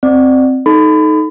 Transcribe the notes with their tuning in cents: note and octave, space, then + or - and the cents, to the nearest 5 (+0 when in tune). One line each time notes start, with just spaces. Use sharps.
C4 +0 D5 +20
D#4 +0 A4 -15 B5 +30